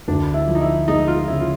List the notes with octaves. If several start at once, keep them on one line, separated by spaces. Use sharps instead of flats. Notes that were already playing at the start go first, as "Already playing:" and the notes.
D2 D4
E4
F3
D#4
E4
G#3 D#4
F4
C#3 E4
F4